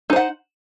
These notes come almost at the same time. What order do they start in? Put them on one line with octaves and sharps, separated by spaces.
D#4 C5 F#5